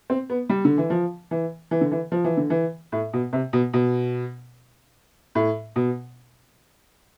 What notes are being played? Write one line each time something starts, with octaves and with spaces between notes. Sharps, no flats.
C4
B3
G3
D3
E3
F3
E3
E3
D3
E3
F3
E3
D3
E3
A2
B2
C3
B2
B2
A2
B2